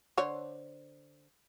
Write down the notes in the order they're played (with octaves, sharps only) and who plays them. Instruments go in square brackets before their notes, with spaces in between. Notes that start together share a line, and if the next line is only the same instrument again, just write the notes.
[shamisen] D3 C5 C#5